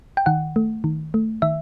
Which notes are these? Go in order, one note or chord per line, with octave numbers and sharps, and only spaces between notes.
G5
D#3 F#5
A3
D#3
A3
D#3 E5